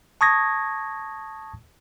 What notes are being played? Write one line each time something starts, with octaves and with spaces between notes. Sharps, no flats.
A5 C#6 D#6 G#6 A#6